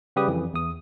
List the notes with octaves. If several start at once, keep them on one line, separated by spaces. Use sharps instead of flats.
C#3 G3 G4 B4 D#6
F2 E3
E2 D#6